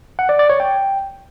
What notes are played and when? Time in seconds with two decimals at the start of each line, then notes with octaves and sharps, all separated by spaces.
0.19 F#5
0.29 D5
0.39 D5
0.50 C#5
0.60 G5